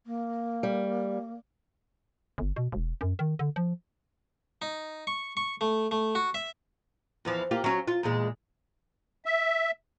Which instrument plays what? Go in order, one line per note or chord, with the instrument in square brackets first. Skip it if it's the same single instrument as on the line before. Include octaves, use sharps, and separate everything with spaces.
[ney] A#3
[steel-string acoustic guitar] G3
[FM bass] G1
B2
E1
F#2
D#3
D3
F3
[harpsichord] D#4
C#6
C#6
A3
A3
F#4
E5
[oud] E2 E3 F3
A#3 F4 G4
F#3 C#4
F4
E2 A#2 G#3
[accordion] E5